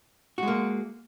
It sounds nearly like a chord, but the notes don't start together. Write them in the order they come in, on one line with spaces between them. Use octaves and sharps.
F#4 G#3 A#3